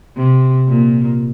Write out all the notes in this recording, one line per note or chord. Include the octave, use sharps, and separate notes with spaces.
C3
A#2